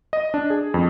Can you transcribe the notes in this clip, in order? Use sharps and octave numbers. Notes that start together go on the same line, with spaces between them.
D#5
D4
G#4
F2